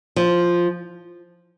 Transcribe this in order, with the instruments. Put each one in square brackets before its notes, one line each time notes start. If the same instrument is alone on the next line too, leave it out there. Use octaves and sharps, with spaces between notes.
[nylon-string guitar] F3